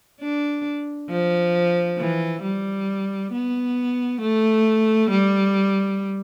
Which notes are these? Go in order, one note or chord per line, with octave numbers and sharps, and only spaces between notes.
D4
F3
E3
G3
B3
A3
G3